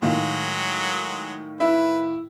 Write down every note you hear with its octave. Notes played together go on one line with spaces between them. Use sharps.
A2 D#3 F#3 G#3 F4
E4 B4 E5